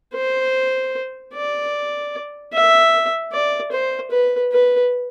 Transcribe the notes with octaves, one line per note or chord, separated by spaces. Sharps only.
C5
D5
E5
D5
C5
B4
B4